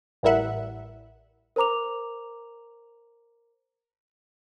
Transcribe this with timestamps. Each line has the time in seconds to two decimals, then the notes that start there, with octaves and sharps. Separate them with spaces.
0.23 A1 G3 E4 A#4 E5 F#5
1.56 A#4 C5 A#5 D6 F7